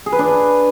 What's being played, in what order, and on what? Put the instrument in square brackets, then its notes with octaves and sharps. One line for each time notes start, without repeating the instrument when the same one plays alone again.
[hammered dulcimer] G#4
B4
D4